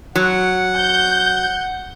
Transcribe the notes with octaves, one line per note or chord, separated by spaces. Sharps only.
F#3 F#5
G6